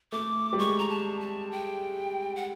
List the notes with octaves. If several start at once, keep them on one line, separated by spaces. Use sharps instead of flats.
A3 D6
G3
G#3 C#6
A#5
A5
A5
G5
F#5